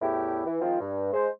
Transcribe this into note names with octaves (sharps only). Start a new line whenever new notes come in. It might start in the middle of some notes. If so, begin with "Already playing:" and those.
E2 A2 E4 G4
E3
D#3 F3 G#3 C4 F4
G2
G#3 C5